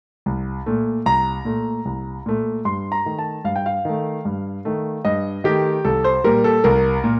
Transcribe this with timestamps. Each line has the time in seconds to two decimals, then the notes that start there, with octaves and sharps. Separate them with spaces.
0.26 C2
0.66 A#2 A3
1.06 C2 A#5
1.45 A#2 A3
1.85 C2
2.26 A#2 A3
2.65 G2 C6
2.92 A#5
3.05 D#3 A3
3.19 A5
3.45 G2 F5
3.56 G5
3.66 F5
3.85 D#3 A3
4.25 G2
4.65 D#3 A3
5.05 G2 D#5
5.44 D#3 A3 G4
5.85 C2 A4
6.04 C5
6.24 A#2 G3 A#4
6.44 A4
6.64 C2 A#4
7.04 A#2